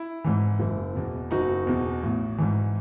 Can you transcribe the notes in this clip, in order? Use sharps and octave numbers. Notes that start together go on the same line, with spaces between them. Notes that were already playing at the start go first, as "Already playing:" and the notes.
Already playing: E4
G#2 E3
F#1
E2 B2
F#1 D#4 F#4
E2 B2
A1
G#2 E3